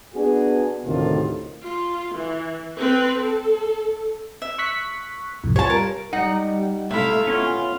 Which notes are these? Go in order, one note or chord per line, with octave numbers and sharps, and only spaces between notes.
B3 D4 F#4 G#4
D2 A2 C3 D#3 F4
F4
E3
C4 B4
A4
E5
C#6 F#6 B6
C2 F2 A2
G3 F4 C#5 A5
A#4
G3 D#4 F#5
C3 A3 E4 E5 F5
B3 C#4 F4